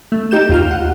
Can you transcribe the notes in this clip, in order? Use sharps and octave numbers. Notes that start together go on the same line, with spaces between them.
A3
D#4 G4 G6 E7
D#2 F4 F6
F#5